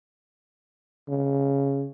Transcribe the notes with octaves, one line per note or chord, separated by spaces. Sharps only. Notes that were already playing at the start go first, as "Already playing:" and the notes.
C#3